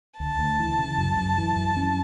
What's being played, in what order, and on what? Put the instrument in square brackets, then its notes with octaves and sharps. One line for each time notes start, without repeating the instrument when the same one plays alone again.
[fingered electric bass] D2 [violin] A5
[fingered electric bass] D2
E3
C#3
F#2
F#2
E3
F#2
C#4